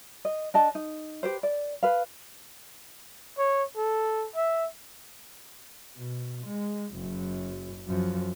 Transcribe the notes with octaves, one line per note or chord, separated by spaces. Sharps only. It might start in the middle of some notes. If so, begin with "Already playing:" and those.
D#5
D4 D#5 A5
D#4
G4 B4 C5
D5
B4 F5
C#5
A4
E5
B2
G#3
F#1 F#2
F#2 F3